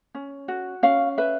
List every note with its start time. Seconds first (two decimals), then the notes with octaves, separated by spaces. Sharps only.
0.15 C#4
0.48 F#4
0.83 C#4 F5
1.18 B4 E5